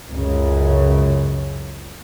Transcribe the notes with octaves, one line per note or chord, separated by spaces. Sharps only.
C#2 F#2 C#3